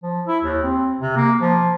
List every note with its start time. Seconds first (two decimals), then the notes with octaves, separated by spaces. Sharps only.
0.03 F3
0.27 E4
0.44 D#2
0.63 C4
1.01 C3
1.17 A#3
1.41 F3